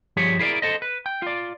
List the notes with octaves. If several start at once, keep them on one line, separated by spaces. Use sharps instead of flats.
G2 F3 G3 G4 G#4 C#5
E4 G#4 A#4 D5
A4 C5 D#5
B4
G5
F4 D5